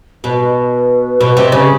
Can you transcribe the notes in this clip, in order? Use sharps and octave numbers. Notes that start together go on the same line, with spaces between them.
B2 B4
B2
C3
C#3